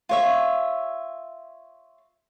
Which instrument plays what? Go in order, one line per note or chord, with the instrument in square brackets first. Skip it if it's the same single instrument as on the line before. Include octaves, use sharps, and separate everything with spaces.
[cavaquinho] F4 C#5 E5